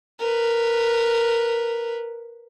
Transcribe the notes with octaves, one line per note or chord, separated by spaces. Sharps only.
A#4 B4